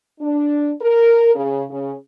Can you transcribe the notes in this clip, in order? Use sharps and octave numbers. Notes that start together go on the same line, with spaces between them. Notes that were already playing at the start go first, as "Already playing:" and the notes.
D4
A#4
C#3
C#3